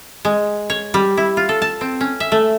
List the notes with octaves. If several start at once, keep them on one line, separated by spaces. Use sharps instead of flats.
G#3
C#5
G3
E4
F4
A4
A5
C4
C#4
E5
A3